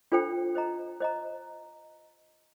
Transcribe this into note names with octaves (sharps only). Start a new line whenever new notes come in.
D4 F4 A4 C5 G5
C5 D#5 A#5
C5 D#5 A#5